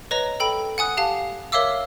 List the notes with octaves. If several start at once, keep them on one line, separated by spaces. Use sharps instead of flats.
B4 C#5 D#5 A#5
A4 G5 B5
F#5 G#5 D#6 F#6
G4 F5 A5
A#4 C#5 E5 F5 D6 E6